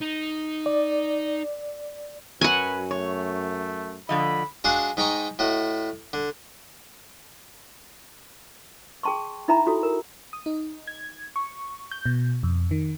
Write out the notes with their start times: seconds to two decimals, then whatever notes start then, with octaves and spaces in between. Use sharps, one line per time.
0.01 D#4
0.66 D5
2.41 F#2 F#3 B4 F#5 G#5
2.91 A3 C#5
4.09 D3 F3 D#5 B5
4.64 G#3 D4 F#4 G#4 F5 F#5
4.97 G#2 D#4 D#5 G5 A#5 C#6
5.39 A2 F#4 D#5
6.13 D3
9.03 G#4 G5 A5 C6 C#6
9.48 D#4 E4 E5 G#5 A#5 B5
9.66 E4 F#4 A4
9.83 A#4
10.33 D#6
10.46 D#4
10.87 G#6
11.36 C#6
11.91 G6
12.06 B2
12.43 F2
12.71 D#3